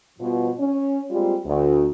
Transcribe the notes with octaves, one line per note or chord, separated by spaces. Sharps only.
G2 B2 F3
C#4
G3 G#3 A#3 C4 F4 G4
D2